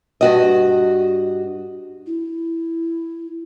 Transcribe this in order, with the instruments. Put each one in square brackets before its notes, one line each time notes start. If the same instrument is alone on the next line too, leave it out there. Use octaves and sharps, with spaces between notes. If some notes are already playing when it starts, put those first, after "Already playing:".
[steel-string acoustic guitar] G2 F#4 D#5
[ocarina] E4